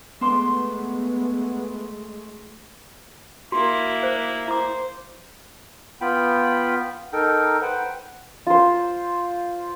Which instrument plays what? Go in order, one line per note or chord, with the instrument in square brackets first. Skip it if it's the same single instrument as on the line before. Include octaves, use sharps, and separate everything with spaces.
[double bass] G#3 A3 [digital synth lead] B3 [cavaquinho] C5 C6 D6
[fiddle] A#3 E4 [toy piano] F#4
[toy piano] C5
[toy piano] E4 D6 [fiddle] C5
[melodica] B3 F4 G5 B5
D#4 A4 A#4 G5
B4 C5 F#5 G5
[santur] F4 C5